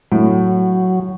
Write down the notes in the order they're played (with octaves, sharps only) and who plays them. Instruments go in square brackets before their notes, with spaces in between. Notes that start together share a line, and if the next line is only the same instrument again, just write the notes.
[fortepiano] A2 [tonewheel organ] F#3